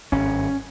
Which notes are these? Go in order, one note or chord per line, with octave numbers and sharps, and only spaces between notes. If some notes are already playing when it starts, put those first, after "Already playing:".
G#1 G2 C#4